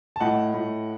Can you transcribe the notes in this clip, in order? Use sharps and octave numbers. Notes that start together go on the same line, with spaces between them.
A5
A2 D#5 F#5
A2